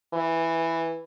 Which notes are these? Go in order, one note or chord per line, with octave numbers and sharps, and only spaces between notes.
E3